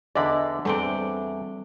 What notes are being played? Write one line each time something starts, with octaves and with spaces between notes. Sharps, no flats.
E2 D3 D5 D#5 B5
E2 G3 A3 C4 D4 G5